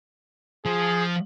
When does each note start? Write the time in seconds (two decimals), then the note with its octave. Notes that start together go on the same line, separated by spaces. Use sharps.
0.66 F3 G#4